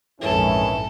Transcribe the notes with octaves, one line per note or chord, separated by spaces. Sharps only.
A#1 F2 G#2 D#3 E3 C#4 E4 A4